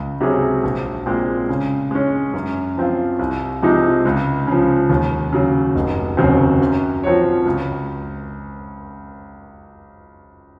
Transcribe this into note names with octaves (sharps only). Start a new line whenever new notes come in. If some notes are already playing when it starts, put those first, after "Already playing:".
Already playing: C#2
C3 F#3 C#4 G#4
A#1
A#2 G#3 C4
C#3
G#3 C#4
F#2
F3 C4 F4
C2
C3 F3 G#3 D#4
C#2
C#3 F3
D#2
C#3 F#3
F1
D#2 C#3 F#3 C4
F#2
F3 C4 F#4 C#5
C#2